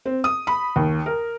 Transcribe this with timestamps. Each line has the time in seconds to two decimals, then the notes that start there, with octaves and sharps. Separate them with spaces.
0.06 C4
0.24 D#6
0.47 B5
0.76 D#2
1.06 A#4